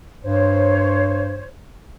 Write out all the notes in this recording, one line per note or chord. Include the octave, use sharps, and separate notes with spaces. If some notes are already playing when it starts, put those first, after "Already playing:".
G2 C5 C#5